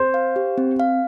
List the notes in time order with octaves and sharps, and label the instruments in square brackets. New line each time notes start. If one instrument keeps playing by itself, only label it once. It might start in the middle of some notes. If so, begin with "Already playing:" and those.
Already playing: [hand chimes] C4 [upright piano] C5
[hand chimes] F5
G4
C4
F5